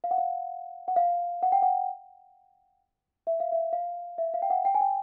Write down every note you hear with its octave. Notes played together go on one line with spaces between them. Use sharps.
F5
F#5
F5
F#5
F5
F#5
G5
F#5
E5
F5
E5
F5
E5
F5
G5
F#5
G5
G#5
G5